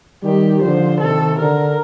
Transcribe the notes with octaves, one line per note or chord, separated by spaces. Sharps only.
D#3 G3 G4
D3 F3 C5
C3 D#3 A4
D3 A#4